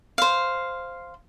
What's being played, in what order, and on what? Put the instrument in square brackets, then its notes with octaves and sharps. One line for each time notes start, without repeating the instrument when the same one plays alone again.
[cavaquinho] C5 F5